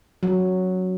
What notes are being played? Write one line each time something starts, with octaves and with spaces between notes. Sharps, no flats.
F#3